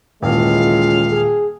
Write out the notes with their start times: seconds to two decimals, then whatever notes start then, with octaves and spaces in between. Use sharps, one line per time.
0.22 D#1 C#3 E3 G#3 F4 F5
1.10 G#4